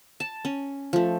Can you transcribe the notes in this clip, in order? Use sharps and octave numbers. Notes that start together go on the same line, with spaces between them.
A5
C#4
F3 A3